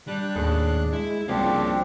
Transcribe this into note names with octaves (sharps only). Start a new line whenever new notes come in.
G3 D4 F#6
D#2 A2 G#4
G#3 E4
C2 C#3 F3 A#3 C4 D4 F#4 G4